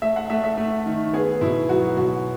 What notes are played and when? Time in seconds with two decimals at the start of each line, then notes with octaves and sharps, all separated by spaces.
0.02 A3 E5
0.16 F#5
0.30 A3 E5
0.44 E5
0.58 A3
0.86 D#3
1.14 B3 G#4
1.41 B2 E4
1.69 F#3 F#4
1.97 B2 F#4